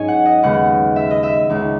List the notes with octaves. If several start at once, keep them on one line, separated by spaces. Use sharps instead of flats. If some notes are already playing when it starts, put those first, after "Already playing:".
Already playing: G#2 F#3 C#4 C#5 D#5 G#5
F#5
D#5
D#2 C#3 G#3 B3 F#5
E5
D#5
E5
C#2 C#3 G#3 D#4